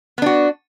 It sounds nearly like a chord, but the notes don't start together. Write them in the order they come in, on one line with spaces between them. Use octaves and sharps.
B3 D4 F#4